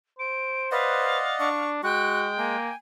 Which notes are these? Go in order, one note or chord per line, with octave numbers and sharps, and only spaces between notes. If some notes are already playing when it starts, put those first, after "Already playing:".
C5 D7
B4 D5 D#5 F5 F#5
D4 C#6
G#3 F#4 G5 F#6
A#3 G#5